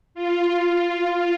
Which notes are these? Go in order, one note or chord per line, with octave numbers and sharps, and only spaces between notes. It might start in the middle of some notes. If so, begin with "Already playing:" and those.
F4